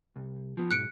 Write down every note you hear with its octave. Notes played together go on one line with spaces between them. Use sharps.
C2
F3 B3
B1 G#2 F#6 C#7 D7